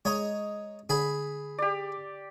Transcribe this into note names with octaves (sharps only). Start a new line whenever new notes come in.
G#3 C#5 D#5 A#5
D3 G#4 B5
G4 D5